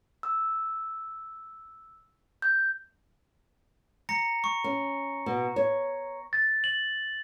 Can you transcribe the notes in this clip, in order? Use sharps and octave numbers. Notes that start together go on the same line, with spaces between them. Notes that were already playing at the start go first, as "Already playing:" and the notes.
E6
G6
A#5 A#6 C#7
C#6
C#4
B2
C#5
A6
F#7